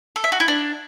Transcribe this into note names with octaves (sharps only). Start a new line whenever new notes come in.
A4
E5
F#4
E4
D4